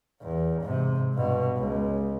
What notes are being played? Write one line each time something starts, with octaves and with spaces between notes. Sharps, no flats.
E2
G#2 C3
G2 B2
C#2